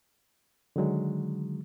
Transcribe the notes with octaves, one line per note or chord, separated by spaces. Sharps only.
D3 D#3 F#3 G#3